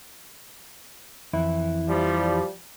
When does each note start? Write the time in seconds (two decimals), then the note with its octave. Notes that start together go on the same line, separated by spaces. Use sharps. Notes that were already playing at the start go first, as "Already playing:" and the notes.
1.33 F2 E3 E4
1.87 F3 G3